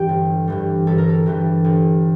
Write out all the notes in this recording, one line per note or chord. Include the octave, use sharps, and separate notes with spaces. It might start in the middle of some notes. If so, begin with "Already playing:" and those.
Already playing: G2 E3 G3 G5
G1
G2 E3 G3
G1 A4
A#4
A4
G2 E3 G3
G1